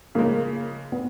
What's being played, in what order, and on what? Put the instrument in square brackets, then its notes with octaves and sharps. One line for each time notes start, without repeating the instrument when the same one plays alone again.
[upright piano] C#3 F3 G#3 [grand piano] A#3
[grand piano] B3